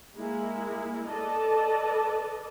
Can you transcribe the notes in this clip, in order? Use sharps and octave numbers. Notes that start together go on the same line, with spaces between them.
G#3 A#3 E4
A4 B4 D5 D#5 A5